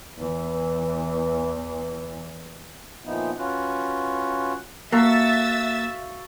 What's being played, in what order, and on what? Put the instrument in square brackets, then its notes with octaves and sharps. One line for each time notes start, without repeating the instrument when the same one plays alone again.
[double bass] E2 E3
[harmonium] A#2 F3 B3 D#4 E4
C#4 F4 F#4 B4
[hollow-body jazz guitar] A#3 [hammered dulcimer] F#4 A4 F5 [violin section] E5 E6 A6